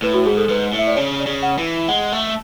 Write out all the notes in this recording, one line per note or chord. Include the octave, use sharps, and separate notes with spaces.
A2 B4
F#4
G#2 G#4
A4
G#2 B4
A2
E5
D5
C#3 C#5
D5
C#3
F#5
E3
G#3 F#5
A3